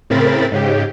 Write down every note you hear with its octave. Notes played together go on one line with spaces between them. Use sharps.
A2 C#3 C4 A#4 B5 A6
G#2 C#3 G4